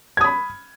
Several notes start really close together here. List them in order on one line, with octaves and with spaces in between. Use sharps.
G#6 D#6 B5